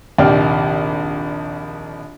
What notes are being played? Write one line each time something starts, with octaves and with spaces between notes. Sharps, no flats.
A#1 D#2 C3 D5 G5 F6